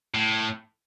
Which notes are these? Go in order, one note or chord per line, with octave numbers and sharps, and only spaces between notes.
A2